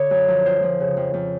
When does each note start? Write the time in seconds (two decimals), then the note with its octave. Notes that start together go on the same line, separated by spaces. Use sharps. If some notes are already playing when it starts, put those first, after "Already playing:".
Already playing: D3 C#5
0.10 F#2
0.28 F3
0.45 F2 C5
0.63 F3
0.80 C#3
0.97 F2
1.14 F2